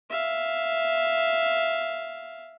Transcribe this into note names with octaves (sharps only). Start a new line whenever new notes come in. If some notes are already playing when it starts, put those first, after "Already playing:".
E5 F5